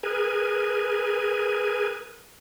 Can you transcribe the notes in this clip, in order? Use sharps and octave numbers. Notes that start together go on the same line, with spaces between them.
G#4 A#4 B4 G#5